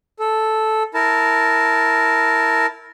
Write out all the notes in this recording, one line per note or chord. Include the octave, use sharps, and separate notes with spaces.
A4
E4 A#4 A5